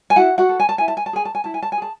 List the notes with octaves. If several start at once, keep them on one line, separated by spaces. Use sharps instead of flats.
G#5
E4 F#4 F#5
F#4 F#5
A4
G#5
A5
E4 G#5
A5
G#5
A5
G#4 G#5
A5
G#5
E4 A5
G#5
A5
G#5
G#4 A5